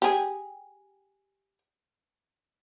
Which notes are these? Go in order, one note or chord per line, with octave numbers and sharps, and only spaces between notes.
G4 G#4